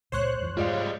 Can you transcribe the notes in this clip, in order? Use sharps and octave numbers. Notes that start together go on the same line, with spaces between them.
C#2 A#2 G#3 C5 C#5 F#6
F2 E3 F3
G#2 G3 G#3 F4 D5 F5